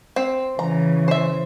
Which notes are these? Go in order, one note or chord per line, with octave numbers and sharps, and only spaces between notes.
C4
C#3 E3 A#5
C5 E5